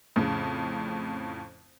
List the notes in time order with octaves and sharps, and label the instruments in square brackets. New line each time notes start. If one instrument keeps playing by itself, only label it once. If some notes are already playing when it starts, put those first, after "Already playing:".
[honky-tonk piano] F2 A2 C#3